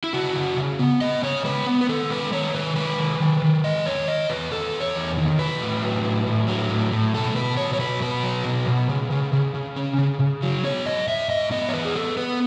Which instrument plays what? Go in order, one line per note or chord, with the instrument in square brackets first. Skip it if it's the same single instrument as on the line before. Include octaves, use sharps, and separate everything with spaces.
[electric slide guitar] E4
C#3 F#4
C#3
C#3
B3
B3 D#5
C#3 C#5
G#3 B4
B3
B4
D#3 A4
G#3 B4
D#3 C#5
D#3 B4
G#3 B4
D#3
D#3
D#3
G#3 D#5
E2 C#5
D#3 D#5
E2 B4
E2 A4
E2
C#5
E2
D#3
F#3 B4
A2
F#3
A2
A2
F#3
A2
A2
B2 A4
B2 B4
F#3 C#5
C#5
B2 B4
B2 B4
F#3
B2
B2
C#3
C#3
C#3
C#3
C#4
C#3
C#3
F#3
B3 C#5
G#2 D#5
G#2 E5
G#2 D#5
B3 D#5
C#5
E3 B4
G#4
B3 A4
B3 B4